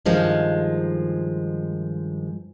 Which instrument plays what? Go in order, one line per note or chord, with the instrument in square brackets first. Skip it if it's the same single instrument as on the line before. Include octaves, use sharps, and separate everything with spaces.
[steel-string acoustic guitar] G2 D#3 F3 G#3